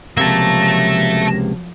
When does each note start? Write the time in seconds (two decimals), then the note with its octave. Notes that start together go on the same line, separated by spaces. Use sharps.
0.17 C#2 C3 F3 F#3 A#3 E5 A5 A#6